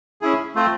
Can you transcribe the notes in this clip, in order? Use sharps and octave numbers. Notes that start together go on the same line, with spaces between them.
C#4 E4 G#4
A3 C4 F4